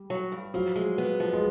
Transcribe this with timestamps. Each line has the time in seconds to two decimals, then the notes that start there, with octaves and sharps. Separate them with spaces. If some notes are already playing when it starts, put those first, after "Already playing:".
Already playing: G3
0.10 F#3
0.32 G2
0.54 F3 F#3
0.76 G#3
0.98 B3
1.20 F3
1.33 G#3